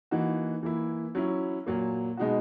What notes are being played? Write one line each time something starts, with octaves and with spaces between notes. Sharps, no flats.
E3 A#3 D#4 F#4
E3 A#3 E4
F#3 C#4 E4
A#2 F#3 A#3
B2 G#3 D#4 F#4